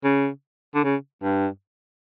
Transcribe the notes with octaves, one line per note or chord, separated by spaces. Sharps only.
C#3
D3
C#3
G2